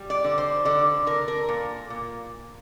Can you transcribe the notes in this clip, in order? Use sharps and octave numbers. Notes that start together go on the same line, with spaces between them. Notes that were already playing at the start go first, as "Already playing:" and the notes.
Already playing: G3
D5
D3
C5
D3 D5
D3 A#4
A#4
A#2
A#2